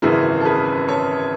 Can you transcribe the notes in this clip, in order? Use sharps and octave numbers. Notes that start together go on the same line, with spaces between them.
G#1 F#2 C#3 E3 E4 G#4
A4
G#4 B4
A4 C#5